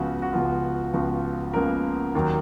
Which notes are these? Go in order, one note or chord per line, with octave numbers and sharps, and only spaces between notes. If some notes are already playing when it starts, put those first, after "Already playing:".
Already playing: C#2 C#3 F3 B3 F#4
F#4
C#2 C#3 F3 B3 F4
C#2 C#3 F3 B3 F#4
C#2 C#3 F3 A#3 B3 A#4
D#2 D#3 F#3